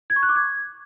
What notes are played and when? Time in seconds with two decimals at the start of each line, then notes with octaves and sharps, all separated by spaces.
0.10 G#6
0.16 C#6
0.23 F#6
0.29 D6
0.35 G#6